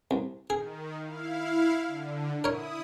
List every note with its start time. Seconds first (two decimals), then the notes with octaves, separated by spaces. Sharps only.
0.11 C2
0.50 D#3 G#4
1.01 E4 F5
1.87 D3
2.44 E4 A#4 C#5 D#6